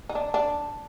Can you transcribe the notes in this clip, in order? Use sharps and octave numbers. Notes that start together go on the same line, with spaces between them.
D#4
D4
D4